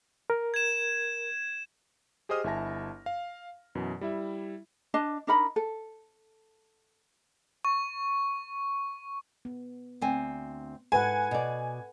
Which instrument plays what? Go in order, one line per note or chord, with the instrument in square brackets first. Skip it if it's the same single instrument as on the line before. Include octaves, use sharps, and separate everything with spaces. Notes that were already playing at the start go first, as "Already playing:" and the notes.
[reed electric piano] A#4
[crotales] G#6 E7
[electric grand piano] G4 G#4 C5 D#5 D#6 F6
G1 E4 E5 G#5 A5 A#6
F5
F#2 B2 E3
G3 E4 E5
[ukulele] D4 D#5 A5
D4 D#4 A#4 B5
A4
[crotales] C#6
[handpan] B3
[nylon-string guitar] D2 C4 G#5
[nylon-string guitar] G#2 [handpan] A4 B4 F#5 [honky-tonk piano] G#5
[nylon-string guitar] B2 D5